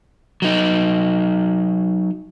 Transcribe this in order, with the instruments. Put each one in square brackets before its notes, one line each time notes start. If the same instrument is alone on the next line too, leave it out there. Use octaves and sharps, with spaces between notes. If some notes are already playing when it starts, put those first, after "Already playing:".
[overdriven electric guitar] F#3 D#4